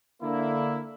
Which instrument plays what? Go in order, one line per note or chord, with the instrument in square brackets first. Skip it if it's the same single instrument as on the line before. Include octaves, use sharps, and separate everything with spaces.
[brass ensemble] D3 A#3 E4